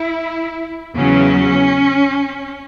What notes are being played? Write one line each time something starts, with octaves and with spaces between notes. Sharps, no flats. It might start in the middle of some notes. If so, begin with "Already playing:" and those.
Already playing: E4
E2 C#3 F#3 C#4